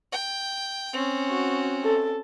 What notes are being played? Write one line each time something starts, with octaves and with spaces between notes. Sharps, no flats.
G5
C4 C#4
F#4
A4